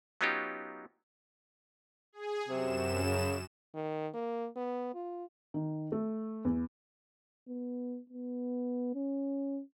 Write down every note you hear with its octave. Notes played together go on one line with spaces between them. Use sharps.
F#3 B3 C#4 D#4 F4 G4
G#4
F#2 C3 E7
C#3
D#3
A#3
B3
F4
D#3
A3
E2
B3
B3
C#4